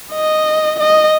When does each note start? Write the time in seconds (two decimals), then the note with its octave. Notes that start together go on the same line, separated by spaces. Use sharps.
0.13 D#5
0.80 D#5